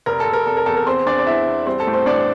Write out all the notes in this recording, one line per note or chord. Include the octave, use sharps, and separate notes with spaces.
F1 A#4
A4
F1
A#4
F1 A4
A#4
E2 A4
A#4
E2 C4 C5
E2 D4 D5
D5
E2 E4 E5
E2
G3 C4 C5
A4
A2
C4 C5
A1 D4 D5